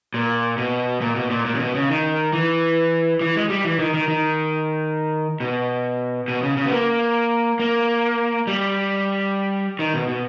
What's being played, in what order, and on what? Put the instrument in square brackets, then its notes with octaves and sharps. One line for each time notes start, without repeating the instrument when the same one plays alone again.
[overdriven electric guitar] A#2
B2
A#2
B2
A#2
A#2
C#3
B2
C#3
D#3
E3
E3
G#3
G3
E3
D#3
D#3
D#3
B2
B2
C#3
C#3
B3
A#3
A#3
G3
D#3
B2
B2